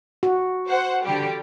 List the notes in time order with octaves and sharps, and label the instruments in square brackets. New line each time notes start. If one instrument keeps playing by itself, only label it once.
[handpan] F#4
[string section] C5 F#5
D3 G3 G4